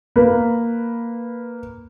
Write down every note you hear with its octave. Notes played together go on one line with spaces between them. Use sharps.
A#3 B4